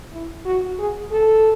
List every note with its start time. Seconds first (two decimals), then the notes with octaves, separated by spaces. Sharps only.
0.12 E4
0.45 F#4
0.79 G#4
1.11 A4